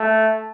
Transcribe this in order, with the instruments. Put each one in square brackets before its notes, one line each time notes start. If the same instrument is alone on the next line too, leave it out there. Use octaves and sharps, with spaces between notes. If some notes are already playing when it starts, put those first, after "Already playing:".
Already playing: [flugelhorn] A3